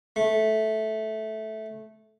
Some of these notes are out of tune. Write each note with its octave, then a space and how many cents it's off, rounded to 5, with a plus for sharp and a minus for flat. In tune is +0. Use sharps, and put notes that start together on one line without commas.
A3 -10